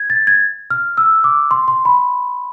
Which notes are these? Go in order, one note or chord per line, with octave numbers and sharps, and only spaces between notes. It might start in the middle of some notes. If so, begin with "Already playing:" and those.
Already playing: G#6
A6
G#6
F6
E6
D6
C6
C6
B5